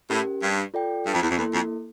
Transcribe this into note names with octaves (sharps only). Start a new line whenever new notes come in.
A2 C#4 G4 A#4
G2
F4 A4 D5 G5
G2
F2
E2
F2
E2 A#3 E4 A4
F2